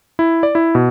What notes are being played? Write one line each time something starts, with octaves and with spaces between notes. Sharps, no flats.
E4
D5
E4
B2